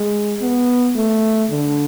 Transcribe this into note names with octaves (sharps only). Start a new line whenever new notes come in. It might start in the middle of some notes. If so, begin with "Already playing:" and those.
Already playing: G#3
B3
A3
D3